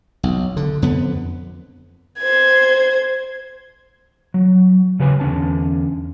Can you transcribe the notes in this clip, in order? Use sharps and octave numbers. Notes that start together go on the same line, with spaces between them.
B1
D3
F2 D3 B3
C5 G#6
F#3
C#3 F#3 G4 B4 C#5 G#5
E2 D3 C#4 A5